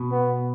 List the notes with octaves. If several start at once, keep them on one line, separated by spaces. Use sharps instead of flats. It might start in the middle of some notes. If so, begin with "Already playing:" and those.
Already playing: B2
B3